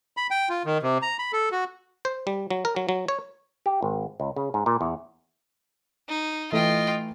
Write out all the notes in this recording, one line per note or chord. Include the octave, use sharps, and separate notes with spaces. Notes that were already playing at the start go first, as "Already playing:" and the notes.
B5
G5
F4
D#3
C3
A#5
B5
A4
F#4
C5
G3
F#3
A#4
F#3
F#3
C#5
G4
G#1
C#2
C#3
G#2
A#2
E2
D#4
E3 A3 F4 D#5 G5